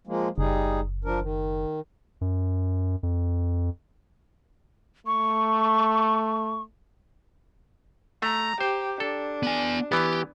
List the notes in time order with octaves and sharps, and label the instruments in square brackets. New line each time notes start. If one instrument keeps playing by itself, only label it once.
[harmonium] F3 G#3 A#3
[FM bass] F#1 [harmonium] G3 D#4 G#4
[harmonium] F3 D4 A#4
D#3
[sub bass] F#2
F2
[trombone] A3 [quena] C#6
[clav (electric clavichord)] A3 [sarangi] A#5
[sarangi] G4 [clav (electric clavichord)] C5
[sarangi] D4 [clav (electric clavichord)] A4
[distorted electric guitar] B3 G#5
[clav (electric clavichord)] E3 B3 [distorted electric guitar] G4